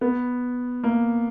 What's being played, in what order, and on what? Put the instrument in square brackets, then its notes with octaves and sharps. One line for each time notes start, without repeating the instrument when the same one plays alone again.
[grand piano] B3
A#3